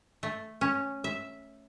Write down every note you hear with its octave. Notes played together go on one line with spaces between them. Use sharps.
A3
C#4
E5